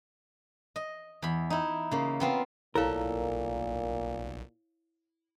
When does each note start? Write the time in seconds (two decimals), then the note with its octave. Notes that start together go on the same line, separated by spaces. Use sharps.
0.76 D#5
1.22 E2 B5
1.50 D#4 E4
1.91 C#3 A#3
2.20 B3 C4 F4
2.75 B1 A#2 E4 A4 A#4 C#5 F5